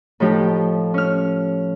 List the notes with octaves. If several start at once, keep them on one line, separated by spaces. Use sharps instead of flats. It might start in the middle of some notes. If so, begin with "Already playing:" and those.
A2 F3 D#4 G4
C#4 F6